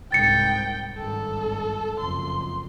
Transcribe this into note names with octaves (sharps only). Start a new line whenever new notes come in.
C2 G#2 G5 A6 C#7
G#1 G2 A4
F#1 F2 C6